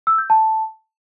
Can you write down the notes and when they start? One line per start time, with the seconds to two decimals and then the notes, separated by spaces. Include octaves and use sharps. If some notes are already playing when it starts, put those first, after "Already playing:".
0.07 E6
0.18 G6
0.30 A5